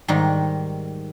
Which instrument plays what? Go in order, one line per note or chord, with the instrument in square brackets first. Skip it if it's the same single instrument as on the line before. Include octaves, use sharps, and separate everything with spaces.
[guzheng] G#2 D#3 G3